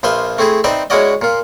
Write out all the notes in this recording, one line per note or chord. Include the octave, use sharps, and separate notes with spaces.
A#1 F3 B4 E5 C6
A3 C4 E4 G#4
C4 D#4 B4 C5 D5 E5
G#3 C#4 E4 F#4 D5 D#5
A#2 F4